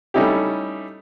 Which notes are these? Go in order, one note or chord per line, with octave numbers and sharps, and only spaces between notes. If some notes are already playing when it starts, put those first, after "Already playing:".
G3 A3 C#4 D#4 E4 G4